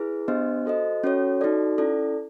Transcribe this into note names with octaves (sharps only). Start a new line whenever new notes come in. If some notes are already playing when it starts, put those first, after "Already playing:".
Already playing: E4 G#4 B4
B3 D4 G4 C5 D#5
F#4 A4 C5 D#5
C#4 F#4 A4 C#5
D#4 F#4 A4 D5
C#4 E4 A4 D5